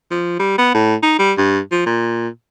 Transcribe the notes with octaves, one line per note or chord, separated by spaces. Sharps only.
F3
G3
B3
A2
D#4
G3
G2
F3
A#2